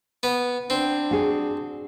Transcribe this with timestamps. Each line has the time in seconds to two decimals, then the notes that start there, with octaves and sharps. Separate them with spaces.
0.23 B3
0.70 C4 D4
1.11 F#4 G#4